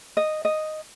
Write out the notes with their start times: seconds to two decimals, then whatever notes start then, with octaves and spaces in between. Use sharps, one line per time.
0.17 D#5
0.45 D#5